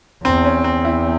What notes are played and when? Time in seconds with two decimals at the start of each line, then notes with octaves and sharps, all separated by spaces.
0.24 E2 C4
0.45 C#4
0.64 C4
0.85 E4